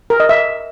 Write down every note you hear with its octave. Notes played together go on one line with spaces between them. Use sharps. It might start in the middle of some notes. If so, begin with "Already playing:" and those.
A#4
D#5
E5